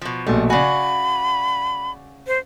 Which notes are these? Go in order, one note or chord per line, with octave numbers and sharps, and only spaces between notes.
B2 F3
A#1 B2 G3 A3
C#3 F#4 D5 G#5 B5
C5